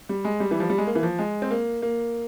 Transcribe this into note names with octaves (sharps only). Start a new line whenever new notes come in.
G3
G#3
G3
E3
F3
G3
G#3
A#3
E3
F3
G#3
C4
A#3
A#3